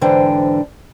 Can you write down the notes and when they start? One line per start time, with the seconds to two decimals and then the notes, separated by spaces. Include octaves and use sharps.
0.01 G#2 D3 E3 D4 C5 G5